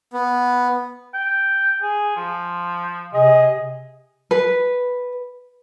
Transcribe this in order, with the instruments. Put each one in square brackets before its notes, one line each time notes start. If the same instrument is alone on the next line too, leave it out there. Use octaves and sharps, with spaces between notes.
[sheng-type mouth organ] B3
[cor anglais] G5
G#4
F3
[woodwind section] C3 D#5 [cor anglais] G#4
[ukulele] B4